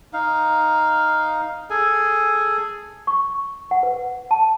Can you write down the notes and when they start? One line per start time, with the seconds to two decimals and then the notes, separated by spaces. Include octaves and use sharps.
0.13 D#4 F5
1.70 G#4 A4 G#5
3.07 C#6
3.71 F#5
3.83 B4
4.31 A5